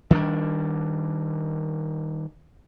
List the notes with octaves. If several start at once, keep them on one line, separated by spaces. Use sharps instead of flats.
D#3 G3 C4 D4